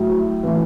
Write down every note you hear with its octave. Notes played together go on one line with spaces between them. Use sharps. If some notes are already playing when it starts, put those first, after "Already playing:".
Already playing: A2 F#3
A2 E3